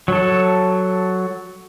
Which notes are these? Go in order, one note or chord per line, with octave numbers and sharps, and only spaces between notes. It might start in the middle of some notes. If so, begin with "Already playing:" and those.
F#3 A4